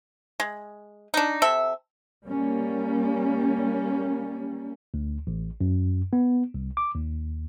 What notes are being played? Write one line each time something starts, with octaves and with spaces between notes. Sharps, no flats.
G#3
D4 D#4
C3 A4 E5
G3 A#3 C#4
D2
A1
F#2
B3
C2
D6
D#2